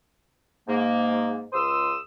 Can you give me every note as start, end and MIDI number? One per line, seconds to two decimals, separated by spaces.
0.68 1.43 44
0.68 1.43 58
1.53 1.96 37
1.53 1.96 84
1.53 1.96 87
1.53 1.96 88